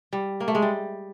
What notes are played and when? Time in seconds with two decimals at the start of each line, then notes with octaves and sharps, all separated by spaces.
0.13 G3
0.40 A#3
0.48 A3
0.55 G#3
0.62 G3